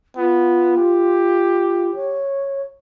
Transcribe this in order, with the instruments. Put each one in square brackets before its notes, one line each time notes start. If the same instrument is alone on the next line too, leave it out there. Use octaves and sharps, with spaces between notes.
[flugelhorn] B3 [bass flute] F4
[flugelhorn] G4
[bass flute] C#5